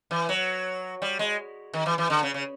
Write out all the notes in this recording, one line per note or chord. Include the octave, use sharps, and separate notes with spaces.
E3
F#3
G3
G#3
D#3
E3
E3
D3
C#3
C#3